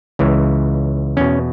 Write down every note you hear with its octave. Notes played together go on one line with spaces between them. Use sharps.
C#2 C#3 E3
E2 B2 C#4